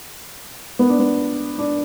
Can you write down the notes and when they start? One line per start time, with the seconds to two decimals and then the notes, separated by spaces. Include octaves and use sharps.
0.79 B3
0.89 D4
0.99 B3
1.58 D4